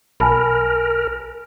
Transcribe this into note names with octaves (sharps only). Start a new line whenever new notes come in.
B1 A#4 G#5 A5 B5